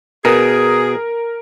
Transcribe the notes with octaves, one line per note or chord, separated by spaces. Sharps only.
B2 G#4 A#4